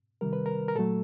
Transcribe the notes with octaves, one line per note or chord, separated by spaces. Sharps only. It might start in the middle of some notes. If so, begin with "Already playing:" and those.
C3 D#3 G3 A#4
B4
A#4
A#4
A#2 F#3 A3 A4